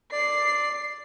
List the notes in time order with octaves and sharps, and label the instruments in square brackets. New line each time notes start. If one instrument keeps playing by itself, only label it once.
[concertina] D5 [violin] C7